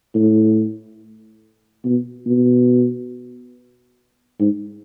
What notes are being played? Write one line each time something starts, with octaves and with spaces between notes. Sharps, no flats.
A2
B2
B2
G#2